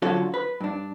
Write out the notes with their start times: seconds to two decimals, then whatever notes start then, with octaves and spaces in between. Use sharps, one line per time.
0.02 D3 F#3 C#4 F4 F#4 A4
0.34 B4
0.61 G2 D4